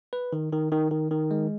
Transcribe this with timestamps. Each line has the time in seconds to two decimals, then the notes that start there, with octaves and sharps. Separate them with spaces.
0.13 B4
0.33 D#3
0.52 D#3
0.72 D#3
0.91 D#3
1.11 D#3
1.31 G#3